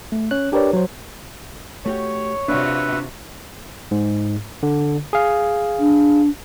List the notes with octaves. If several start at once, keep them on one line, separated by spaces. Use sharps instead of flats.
A3
C#4 C#5 F#6
D4 G4 A#4 B4 C#5 D5
F#3 C5
A3 F#4 G4 C#5
C3 D4 F4 F#4 B4 E5 F5
G#2
D3
G#4 F5
D4